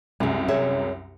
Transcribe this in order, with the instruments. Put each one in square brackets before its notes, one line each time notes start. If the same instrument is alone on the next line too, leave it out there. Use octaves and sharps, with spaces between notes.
[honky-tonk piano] C2 F#2 [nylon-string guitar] G#3 G#4
[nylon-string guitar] G#4 C#5 E5